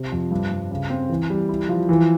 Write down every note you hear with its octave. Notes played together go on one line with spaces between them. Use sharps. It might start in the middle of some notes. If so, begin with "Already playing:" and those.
Already playing: C3
F2
G2
G2
C#3
C4
E3
G3
E4
F3
E3